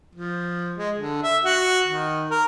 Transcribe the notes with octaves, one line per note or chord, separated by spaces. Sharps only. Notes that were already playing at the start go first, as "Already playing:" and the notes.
F3
G#3
D3
E5
F#4
D#3
A#4